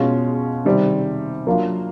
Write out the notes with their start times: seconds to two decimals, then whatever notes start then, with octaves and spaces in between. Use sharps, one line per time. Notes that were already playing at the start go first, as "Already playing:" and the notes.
Already playing: B2 G#3 C#4 F4
0.65 C3 D#3 G3 C4
1.47 F#3 A#3 D4 F4